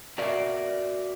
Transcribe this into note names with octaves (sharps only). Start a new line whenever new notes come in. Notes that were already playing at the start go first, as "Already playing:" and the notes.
F#4 A#4 D5 E5 F5